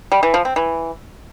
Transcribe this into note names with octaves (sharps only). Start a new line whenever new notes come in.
G3
E3
F3
C4
E3